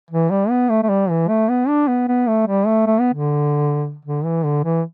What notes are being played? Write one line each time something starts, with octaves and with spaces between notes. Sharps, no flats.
E3
G3
B3
A3
A3
G3
E3
A3
B3
D4
B3
B3
A3
G3
A3
A3
B3
D3
D3
E3
D3
E3